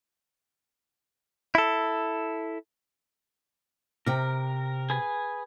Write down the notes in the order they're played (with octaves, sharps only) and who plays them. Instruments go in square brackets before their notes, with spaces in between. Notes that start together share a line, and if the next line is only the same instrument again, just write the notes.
[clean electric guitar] E4 A4
[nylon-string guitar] C3 G5 [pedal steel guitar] A#4
[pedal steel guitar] G#4 B4 G#5